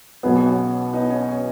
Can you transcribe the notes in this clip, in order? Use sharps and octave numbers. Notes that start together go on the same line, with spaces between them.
B1 B2 B3 D#4 G#4
C#4 F#4
B3 D#4
C#4
C#4